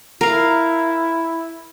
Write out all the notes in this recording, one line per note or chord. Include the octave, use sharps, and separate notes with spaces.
E4 A#4 F5